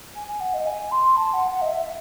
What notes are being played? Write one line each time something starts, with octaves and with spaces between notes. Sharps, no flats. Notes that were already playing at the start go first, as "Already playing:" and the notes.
G#5
G#5
F#5
D#5
G#5
C6
A5
F#5
F#5
D#5
E5